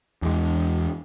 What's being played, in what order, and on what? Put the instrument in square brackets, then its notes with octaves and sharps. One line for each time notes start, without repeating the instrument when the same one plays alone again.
[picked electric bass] E2 G#3